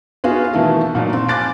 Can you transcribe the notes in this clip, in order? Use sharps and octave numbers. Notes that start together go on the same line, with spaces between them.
B3 D#4 F4 F#4 G#4
B2 D#3 E3 A3 E4 A4
A#2 F3 F#3 D#4
C4
G#5 D6 F#6 A6 D7